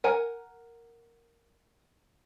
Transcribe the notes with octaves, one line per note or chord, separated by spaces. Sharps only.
A#4 F#5 G#5 A#5